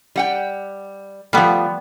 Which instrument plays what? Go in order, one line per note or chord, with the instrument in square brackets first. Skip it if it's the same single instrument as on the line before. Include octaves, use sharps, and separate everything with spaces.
[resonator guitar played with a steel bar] G3 F#5 G5
[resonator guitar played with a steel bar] F3 A3 [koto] G3 B3